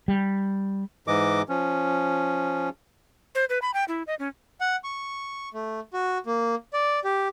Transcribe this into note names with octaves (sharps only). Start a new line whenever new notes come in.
G3
G#2 E3 D#5 D6
F3 C#4
C5
B4
B5
G5
E4
D#5
C#4
F#5
C#6
A3
F#4
A#3
D5
G4